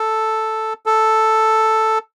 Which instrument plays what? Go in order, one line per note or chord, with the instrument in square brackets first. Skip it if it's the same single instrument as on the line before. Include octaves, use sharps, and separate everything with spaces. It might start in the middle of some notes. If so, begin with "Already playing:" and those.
Already playing: [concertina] A4
A4